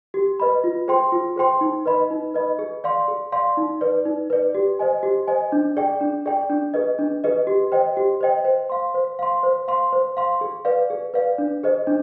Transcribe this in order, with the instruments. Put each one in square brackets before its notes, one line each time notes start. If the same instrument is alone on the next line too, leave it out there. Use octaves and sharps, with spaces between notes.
[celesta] G4
B4 D#5 B5
F4
G#4 C5 G5 C6
F4
G#4 C5 G5 C6
D#4
B4 D#5 B5
D#4
B4 D#5 B5
G#4
D5 F5 C6
G#4
D5 F5 C6
D#4
B4 D5
D#4
B4 D5
G4
C5 D#5 G#5
G4
C5 D#5 G#5
D4
G#4 D5 G5
D4
G#4 D5 G5
D4
G#4 B4 D#5
D4
G#4 B4 D#5
G4
C5 D#5 G5
G4
C5 D#5 G5
C5
F5 C6
C5
F5 C6
C5
F5 C6
C5
F5 C6
G#4
B4 D5 F5
G#4
B4 D5 F5
D4
G#4 C5 D#5
D4